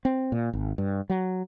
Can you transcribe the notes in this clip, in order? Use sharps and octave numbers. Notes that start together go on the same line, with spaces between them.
C4
A#2
G#1
G2
F#3